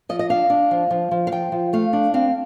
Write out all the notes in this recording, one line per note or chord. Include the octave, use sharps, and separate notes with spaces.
F3 D#5
D#5
D4 F5
D4
F3
F3
F3
F5
F3 G5
F3
A3 F5
D4
C4 F5